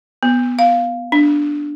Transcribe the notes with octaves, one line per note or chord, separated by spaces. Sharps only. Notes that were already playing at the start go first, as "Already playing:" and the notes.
B3
F5
D4